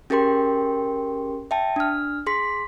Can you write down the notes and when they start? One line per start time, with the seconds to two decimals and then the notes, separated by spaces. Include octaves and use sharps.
0.10 C#4 G4 G#4 A#4 G5 C6
1.51 E5 G5 A5
1.76 D4 F6
2.26 G#4 C6 B6